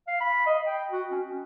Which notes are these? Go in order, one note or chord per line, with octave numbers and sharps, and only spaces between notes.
F5
B5
D#5
G5
F#4
C#4
C#4